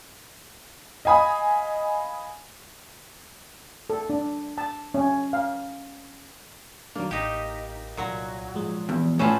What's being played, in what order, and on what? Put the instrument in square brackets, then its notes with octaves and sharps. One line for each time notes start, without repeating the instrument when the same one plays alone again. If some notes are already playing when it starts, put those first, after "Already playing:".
[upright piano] D#5 F5 G#5 B5 D#6
[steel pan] A4
D4
A5
C#4
F5
[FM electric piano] D#3 F#3 D4 [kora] A#3
[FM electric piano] A1 B6 [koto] D#4 G4
[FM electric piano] C2 [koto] A#2 F#3
[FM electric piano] G#2 F3 G#3
[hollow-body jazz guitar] E2
[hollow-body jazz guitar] A2 [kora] C#4 F4 [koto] A4 B4 C5